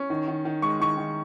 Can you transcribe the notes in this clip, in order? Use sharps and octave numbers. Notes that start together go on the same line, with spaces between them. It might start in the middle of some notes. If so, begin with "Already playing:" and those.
Already playing: C#4
D#3
D#3
D#3
G#3 C#6
D#3 C#6
D#3